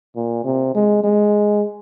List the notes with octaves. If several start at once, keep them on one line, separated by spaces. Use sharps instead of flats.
A#2
C3
G#3
G#3